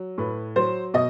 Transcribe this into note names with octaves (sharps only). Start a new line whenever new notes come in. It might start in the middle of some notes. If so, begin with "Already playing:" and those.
Already playing: F#3
A2 B4
F#3 C5
B2 D#5